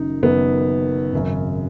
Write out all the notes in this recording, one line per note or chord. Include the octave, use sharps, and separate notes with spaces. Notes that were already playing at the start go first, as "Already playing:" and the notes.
Already playing: F#1 F#2 D#3 D#4
F#1 F#2 D#3 B3
G#1 F#2 C#3